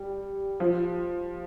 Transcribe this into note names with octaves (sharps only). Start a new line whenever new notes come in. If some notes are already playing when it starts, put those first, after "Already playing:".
Already playing: G3
F3